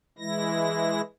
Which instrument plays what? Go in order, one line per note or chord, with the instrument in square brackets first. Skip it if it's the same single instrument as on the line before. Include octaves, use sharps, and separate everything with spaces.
[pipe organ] E3 G#3 E4 A#6